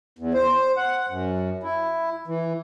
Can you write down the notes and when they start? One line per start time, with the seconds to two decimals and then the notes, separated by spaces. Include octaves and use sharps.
0.19 E2
0.34 C5
0.77 F#5
1.09 F#2
1.63 E4
2.27 E3